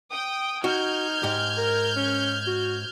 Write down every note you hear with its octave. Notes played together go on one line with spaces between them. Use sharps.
G5 D#6
D#4 F#4 F6 G6 G#6
G#2 G4
A#4
C#4
F#4